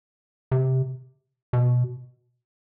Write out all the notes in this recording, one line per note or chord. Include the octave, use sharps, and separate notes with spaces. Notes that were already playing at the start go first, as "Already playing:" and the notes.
C3
B2